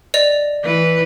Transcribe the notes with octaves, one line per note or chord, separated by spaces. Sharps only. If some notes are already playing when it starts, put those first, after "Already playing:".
D5 D#5 F7
E3 B4